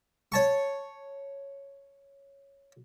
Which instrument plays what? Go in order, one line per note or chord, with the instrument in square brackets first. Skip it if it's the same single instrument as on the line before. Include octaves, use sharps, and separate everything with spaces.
[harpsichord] C#5 A5 C#6